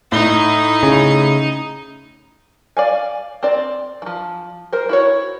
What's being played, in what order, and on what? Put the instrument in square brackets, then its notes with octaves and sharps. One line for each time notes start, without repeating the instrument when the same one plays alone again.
[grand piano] A2 G7 [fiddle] D#4
[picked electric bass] C#3
[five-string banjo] D5 F5 G#5
C4 D5
E3 F3
A#4 C5
E4 F#4 C#5